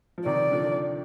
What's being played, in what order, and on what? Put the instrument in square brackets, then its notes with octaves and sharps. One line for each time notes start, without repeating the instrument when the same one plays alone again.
[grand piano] F3
[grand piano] C3 D#3 [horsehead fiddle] D5
[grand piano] D3 F3